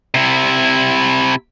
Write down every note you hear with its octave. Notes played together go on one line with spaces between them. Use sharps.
C3 E4